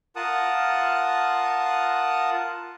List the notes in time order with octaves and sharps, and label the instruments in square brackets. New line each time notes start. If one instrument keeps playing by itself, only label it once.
[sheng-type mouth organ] F4 A#4 F#5 A5 D#6